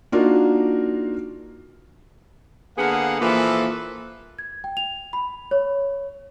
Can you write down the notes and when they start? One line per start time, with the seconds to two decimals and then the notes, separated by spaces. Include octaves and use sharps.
0.12 A#3 D4 D#4 F4 F#4 A#4
2.77 D3 A#3 B3 G#4 F5 F#5
3.21 A#2 E3 F3 A#3 A4 B4
4.39 G#6
4.64 G5
4.77 F7
5.13 B5
5.51 C#5